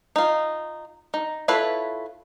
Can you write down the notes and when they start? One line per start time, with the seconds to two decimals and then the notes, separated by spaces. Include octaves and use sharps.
0.16 D#4 F4
1.14 D#4
1.48 E4 F4 A4 B4 C#5